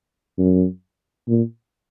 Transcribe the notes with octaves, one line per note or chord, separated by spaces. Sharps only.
F#2
A#2